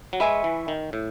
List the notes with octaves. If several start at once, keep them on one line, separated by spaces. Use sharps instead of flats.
F#3
G#3 B4 E5 G#5 C#6
E3
D#3
A2